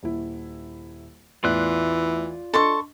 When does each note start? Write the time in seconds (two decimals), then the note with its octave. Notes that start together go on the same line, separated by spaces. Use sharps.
0.03 D#1 E4
1.44 A1 E2 E3 F4 D5 F#6
2.54 D4 A4 D#5 C6 C#6